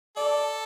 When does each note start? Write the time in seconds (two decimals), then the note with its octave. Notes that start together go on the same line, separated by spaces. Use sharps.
0.17 A4 D5